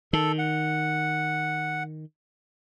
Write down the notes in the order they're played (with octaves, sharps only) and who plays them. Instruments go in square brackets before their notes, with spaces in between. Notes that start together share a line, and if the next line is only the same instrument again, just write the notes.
[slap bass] D#3 [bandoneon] A4
[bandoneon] F#5